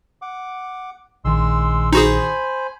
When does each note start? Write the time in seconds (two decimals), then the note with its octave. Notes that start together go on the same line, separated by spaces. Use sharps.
0.22 F#5 D6
1.25 A#1 D#3 G#3 C6 E6
1.93 D#4 F#4 G#4 C5 G#5 B5